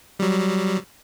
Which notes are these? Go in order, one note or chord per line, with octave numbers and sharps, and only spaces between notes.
F#3 G3